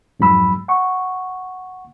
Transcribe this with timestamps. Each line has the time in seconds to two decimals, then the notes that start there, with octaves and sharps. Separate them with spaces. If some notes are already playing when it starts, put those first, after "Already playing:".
0.20 F2 G#2 F#3 B5 E6
0.68 F#5 C#6